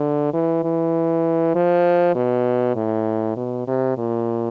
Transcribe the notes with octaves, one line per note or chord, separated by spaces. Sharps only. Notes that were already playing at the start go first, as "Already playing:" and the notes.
Already playing: D3
E3
E3
F3
B2
A2
B2
C3
A#2